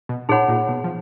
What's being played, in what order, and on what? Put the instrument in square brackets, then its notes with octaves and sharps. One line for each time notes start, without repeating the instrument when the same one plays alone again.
[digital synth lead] B2
[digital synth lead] A#2 [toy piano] D#4 G#4 C#5 F#5 B5
[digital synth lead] A#2
B2
F3